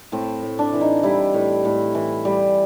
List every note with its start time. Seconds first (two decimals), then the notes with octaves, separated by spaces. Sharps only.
0.12 A2 C4
0.42 A2
0.59 D4
0.73 E3
0.81 D#4
1.03 G3 E4
1.34 A2
1.65 A2
1.95 E3
2.25 G3